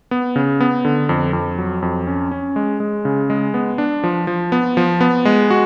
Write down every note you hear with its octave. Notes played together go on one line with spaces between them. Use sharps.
B3
C#3
B3
D3
F2
F2
F#3
F2
C#4
C#4
G#3
G#3
C#3
G#3
B3
D4
F3
F3
B3
F3
B3
G#3
F#4